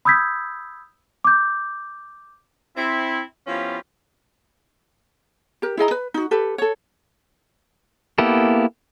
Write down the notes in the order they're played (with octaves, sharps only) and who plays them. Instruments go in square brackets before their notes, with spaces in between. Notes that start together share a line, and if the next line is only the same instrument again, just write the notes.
[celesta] B5 D#6 E6 G6 G#6 B6
D6 G6
[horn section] C4 E4
F3 B3 C#4 E4 F4 G4
[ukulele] G4 A#4
E4 G#4 D#5 A#5
B4
D#4 F#4
G4 A4 B4
A4 C#5
[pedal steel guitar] A#3 B3 E4 G4 A4